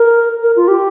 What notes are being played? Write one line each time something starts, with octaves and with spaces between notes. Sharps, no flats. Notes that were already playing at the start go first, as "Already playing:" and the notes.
Already playing: A#4
A#4
F4
G4